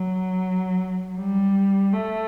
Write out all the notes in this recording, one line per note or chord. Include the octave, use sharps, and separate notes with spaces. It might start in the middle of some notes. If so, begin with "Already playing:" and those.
Already playing: F#3
G3
A3